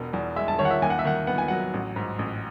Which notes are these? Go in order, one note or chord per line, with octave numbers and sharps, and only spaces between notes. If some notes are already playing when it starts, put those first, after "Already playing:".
Already playing: E1 B2
E2
G#3 E5
A5
D#3 C#5
F#5
E5
D#2 G#5
F#5
E5
D#3 F#5
B3 F#5
G#5
F#3 F#5
A1
G#2
A1